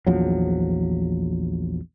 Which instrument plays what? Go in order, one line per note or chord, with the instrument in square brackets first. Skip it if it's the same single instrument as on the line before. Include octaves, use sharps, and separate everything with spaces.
[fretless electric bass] A#1 E2 F3 F#3